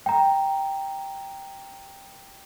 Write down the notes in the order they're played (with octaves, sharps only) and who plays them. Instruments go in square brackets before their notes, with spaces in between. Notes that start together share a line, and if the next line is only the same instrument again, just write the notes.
[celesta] G5 A#5